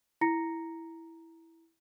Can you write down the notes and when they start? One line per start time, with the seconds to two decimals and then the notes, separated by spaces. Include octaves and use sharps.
0.21 E4 A#5 A#6 C#7